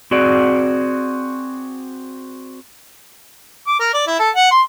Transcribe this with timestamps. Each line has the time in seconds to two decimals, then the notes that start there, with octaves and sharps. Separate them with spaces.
0.11 C4 F#4 G#4 D5
3.67 D6
3.80 A#4
3.94 D5
4.07 E4
4.19 A4
4.36 F#5
4.51 C6